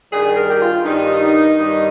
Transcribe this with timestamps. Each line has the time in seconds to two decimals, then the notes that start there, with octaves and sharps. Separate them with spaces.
0.12 G2 D#3 G3 G#4
0.37 A#4
0.50 G4
0.61 F4
0.85 G2 D#3 G3 D#4
1.56 G2 D#3 G3